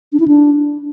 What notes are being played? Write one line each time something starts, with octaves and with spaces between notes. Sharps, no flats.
D4
E4
D4